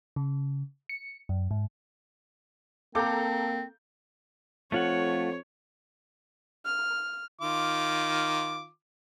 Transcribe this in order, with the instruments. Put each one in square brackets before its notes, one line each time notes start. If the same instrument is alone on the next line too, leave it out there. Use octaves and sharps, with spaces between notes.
[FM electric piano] C#3
C#7
F#2
G#2
[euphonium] A#3 [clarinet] C4 [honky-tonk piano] A4 A#5 [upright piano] F5 D6 G6
[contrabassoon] F2 [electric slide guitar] A3 F4 F#5 [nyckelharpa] C#5
[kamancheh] F6
[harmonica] D#3 F4 D6